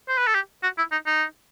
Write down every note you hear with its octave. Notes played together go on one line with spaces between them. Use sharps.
C5
B4
A4
G4
F#4
E4
D#4
D#4